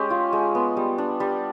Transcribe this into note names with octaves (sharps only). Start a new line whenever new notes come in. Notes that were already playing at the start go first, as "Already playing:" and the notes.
Already playing: G#3 C#4 G4
F4
G#3
B3
G3
D4
G3